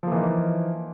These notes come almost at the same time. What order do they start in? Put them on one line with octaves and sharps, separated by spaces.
F3 A#3 E3 D#4